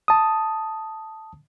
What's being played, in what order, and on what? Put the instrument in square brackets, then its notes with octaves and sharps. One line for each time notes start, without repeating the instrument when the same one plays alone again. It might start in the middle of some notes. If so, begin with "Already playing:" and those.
[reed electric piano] A5 D#6